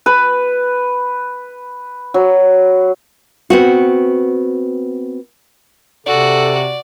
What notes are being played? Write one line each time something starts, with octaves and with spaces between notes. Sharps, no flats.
B4
F#3
B3 C4 F#4
C3 F#4 A4 D5